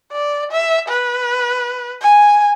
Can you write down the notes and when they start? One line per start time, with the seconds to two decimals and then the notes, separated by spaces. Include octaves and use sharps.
0.12 D5
0.52 E5
0.89 B4
2.01 G#5